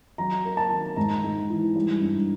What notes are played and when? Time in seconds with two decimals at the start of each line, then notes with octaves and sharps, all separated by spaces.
0.18 F#3 A#5
0.45 A#3
0.57 A5
0.71 D#3
0.96 G#2 A#5
1.24 G#2
1.50 E3
1.76 G3
2.01 G2